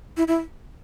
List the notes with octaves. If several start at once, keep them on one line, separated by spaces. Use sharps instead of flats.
E4
E4